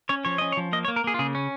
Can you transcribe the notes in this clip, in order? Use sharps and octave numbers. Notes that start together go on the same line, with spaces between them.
C#4 C#5
F3 C#5
C#4 D#5
C#5
F3
A#3 D#5
C#5
A#3
A#4
A#3 G#4
F4
C#3 G#4
C#4